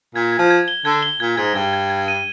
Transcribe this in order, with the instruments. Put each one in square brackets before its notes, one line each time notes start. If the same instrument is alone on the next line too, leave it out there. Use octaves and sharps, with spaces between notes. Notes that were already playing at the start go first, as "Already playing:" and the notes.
[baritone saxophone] A#2 [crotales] G#6
[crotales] G#6
[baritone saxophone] F3
[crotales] G#6
G7
[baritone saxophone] D3 [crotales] G#6
[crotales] G7
[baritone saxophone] A#2 [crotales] G#6
[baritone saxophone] G#2 [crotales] G#6
[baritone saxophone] G2 [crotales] G#6
[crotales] G#6
G#6
D#7